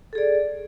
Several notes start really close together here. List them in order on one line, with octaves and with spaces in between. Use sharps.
A4 G#4 D5